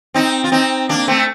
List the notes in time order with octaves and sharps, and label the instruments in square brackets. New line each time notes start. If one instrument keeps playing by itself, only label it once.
[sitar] C4 D#4
F4
C4 D#4
A#3 D4
A3 C4